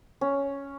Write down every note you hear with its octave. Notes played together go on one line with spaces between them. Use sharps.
C#4